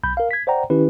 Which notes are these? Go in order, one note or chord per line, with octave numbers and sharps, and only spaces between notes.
B1 B5 G6
A#4 F5
G#6 B6
C5 D5 F#5 G5 A#5
D#3 C#4 E4 G4 B4